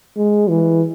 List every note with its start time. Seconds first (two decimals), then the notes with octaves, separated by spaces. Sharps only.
0.17 G#3
0.49 E3